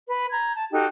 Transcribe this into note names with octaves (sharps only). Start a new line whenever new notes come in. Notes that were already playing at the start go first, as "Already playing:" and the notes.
B4
A#5 G6 G#6
A5
D#4 F#4 G4 A4